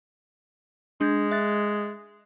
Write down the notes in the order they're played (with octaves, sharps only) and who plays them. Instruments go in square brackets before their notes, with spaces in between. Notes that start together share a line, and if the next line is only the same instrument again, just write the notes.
[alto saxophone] G#3 [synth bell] D4 G6 G#6
[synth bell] E5 F#6 A6